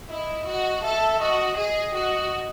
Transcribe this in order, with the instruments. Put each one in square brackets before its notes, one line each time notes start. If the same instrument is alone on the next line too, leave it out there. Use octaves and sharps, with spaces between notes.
[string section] E4 [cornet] D#5
[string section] F#4
[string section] A4 [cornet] E5
[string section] F#4 [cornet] D#5
[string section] G#4 [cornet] D#5
[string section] F#4